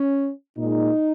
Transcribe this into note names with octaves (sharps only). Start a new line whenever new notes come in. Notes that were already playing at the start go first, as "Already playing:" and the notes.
Already playing: C#4
A#2 G#3 D#4